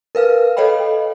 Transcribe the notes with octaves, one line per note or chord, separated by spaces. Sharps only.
A#4 B4 F5 F6
A4 C#5 D#5 F5 G5 B5